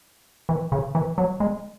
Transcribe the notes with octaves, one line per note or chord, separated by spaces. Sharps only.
E3
C#3
E3
F#3
G#3